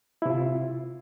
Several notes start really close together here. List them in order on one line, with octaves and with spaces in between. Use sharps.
E4 C3 F4